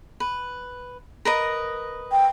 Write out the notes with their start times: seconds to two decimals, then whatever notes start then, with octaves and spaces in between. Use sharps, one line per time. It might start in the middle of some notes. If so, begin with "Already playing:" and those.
0.20 B4
1.25 A#4 B4 D#5
2.12 G5